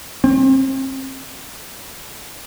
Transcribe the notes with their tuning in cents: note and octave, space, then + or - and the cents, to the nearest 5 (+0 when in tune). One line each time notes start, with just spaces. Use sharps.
C4 +35